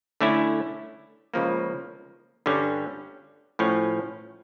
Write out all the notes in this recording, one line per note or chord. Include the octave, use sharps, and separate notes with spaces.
D3 A3 C#4 E4
C#2 C#3 F3 A#3
G2 D3 G3 C#4
A2 F3 C#4